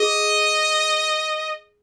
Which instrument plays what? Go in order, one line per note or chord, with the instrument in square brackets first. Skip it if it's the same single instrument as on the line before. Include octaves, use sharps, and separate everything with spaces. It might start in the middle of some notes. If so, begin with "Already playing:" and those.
Already playing: [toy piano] G#4 [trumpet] D#5